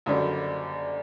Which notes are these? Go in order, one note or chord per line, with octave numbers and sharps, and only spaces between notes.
F#1 F#2 D3 G3